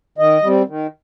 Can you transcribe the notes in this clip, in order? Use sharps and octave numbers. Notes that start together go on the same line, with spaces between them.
D#3 D#5
G3 C4
D#3